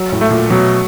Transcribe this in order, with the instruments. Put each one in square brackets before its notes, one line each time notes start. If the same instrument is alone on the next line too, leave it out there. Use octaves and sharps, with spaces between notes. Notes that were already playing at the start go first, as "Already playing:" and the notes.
Already playing: [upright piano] F#3
[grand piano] A2
[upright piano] A3
[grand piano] A#2
[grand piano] B2 [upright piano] F#3